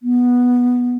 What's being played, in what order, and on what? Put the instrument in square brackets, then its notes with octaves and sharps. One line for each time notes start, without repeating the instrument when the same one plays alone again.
[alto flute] B3